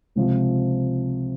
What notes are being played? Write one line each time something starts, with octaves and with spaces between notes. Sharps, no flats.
C#2 C3 F3